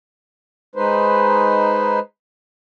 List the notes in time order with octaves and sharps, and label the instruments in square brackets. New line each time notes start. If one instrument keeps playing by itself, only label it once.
[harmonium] G#3 D#4 B4 C5